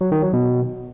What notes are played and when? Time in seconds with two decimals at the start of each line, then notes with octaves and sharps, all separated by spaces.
0.01 F#3
0.12 D#3
0.23 F#3
0.33 B2